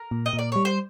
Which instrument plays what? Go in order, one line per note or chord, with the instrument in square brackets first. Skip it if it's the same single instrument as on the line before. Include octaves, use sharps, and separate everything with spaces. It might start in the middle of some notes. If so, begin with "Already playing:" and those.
Already playing: [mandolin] A#4
[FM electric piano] A#2
[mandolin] D#5
[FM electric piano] A#2
[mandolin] D5
[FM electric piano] G3 [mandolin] C#5
[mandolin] C5